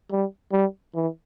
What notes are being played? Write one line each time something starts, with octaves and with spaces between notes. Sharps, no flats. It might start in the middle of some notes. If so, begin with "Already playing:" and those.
G3
G3
E3